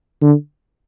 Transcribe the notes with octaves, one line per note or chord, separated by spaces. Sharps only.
D3